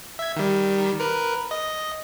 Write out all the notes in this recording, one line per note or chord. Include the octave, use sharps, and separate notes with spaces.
E5 G#6
D#3 G3
A#4 B4
D#5